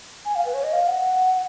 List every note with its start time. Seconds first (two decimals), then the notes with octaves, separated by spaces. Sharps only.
0.25 G#5
0.35 F5
0.45 B4
0.54 C#5
0.64 D#5
0.73 F5
0.87 F#5